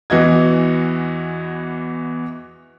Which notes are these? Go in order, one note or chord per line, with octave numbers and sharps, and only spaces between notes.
E2 E3 F#4 D#5 G#6